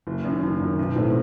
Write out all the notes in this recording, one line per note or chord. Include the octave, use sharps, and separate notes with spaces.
F#1
F#2 D#3
F#1
F#2 D#3
B1
A2 E3 A3 C4